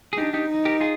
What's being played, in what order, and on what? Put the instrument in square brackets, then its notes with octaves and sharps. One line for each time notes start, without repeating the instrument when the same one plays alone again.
[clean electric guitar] G#4
[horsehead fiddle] D4 [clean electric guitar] D#4 G4
[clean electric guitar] D#4 G4
[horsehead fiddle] D#4
[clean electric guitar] G4 A#4
F4 G#4